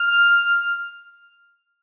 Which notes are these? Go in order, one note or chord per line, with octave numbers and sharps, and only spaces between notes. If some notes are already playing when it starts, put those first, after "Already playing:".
Already playing: F6